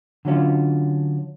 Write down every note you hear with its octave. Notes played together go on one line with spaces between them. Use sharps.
D3 F#3 C#4 F4